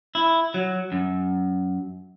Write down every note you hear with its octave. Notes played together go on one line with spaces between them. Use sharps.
E4
F#3
F#2